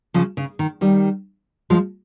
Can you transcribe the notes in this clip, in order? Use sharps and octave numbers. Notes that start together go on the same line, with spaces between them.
C#3 F3
C#3
D#3
D#3 G3
F3 G#3